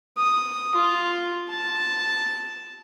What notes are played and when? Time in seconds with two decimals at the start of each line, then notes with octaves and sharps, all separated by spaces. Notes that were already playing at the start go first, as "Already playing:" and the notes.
0.17 D#6
0.75 F4
1.50 A5